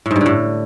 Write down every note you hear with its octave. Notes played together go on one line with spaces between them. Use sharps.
A2
G#2
G2
D3
A2